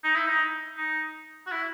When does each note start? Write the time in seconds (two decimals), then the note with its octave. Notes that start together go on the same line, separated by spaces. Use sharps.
0.04 D#4
0.15 E4
0.27 D#4
0.78 D#4
1.46 F#4
1.52 E4